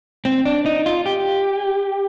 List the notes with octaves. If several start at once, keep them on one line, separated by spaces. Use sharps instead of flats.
C4
D4
D#4
F4
G4